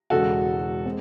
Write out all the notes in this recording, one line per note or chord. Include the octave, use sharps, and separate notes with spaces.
E1 E2 C#3 G#3 F#4 A4
G#3 C4